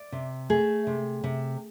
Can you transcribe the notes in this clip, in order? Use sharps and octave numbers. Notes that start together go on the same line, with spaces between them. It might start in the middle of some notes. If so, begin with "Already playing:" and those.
Already playing: D5
C3
A3 G#4
C3
C3